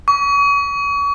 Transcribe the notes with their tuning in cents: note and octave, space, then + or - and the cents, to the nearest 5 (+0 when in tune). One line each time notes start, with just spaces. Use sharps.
C#6 +40